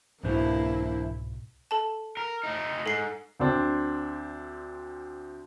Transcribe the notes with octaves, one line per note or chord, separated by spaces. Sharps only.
C2 G#2 B2 E3 A#3 D4 E4 C5
A4 A5
A#4
A3 D#4
G#2 A4 C7
D2 C4 D4